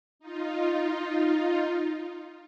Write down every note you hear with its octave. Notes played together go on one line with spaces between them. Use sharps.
D#4 F4